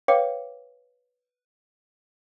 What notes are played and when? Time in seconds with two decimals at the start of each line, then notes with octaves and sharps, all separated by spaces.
0.08 B4 C#5 F5 G5 D6 C#7